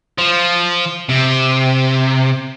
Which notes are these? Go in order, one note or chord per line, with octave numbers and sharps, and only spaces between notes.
F3
C3